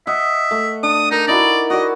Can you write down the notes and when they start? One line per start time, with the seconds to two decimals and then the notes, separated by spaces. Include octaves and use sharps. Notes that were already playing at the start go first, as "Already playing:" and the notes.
0.07 D#5 E5 F#5
0.51 A3
0.83 D4 D#6
1.11 D#4 A#4
1.27 D#4 E4 F#4 D5
1.70 F#4 D5 D#5